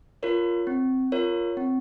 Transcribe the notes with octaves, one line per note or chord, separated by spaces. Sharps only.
F4 A#4 C#5
C4
F4 A#4 C#5
C4